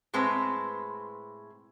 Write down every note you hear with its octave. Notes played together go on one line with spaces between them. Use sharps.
A2 G#3 C4 B4